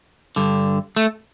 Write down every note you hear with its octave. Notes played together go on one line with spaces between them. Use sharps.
G2 D3
A3